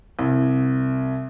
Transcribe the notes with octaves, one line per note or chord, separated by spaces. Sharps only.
C2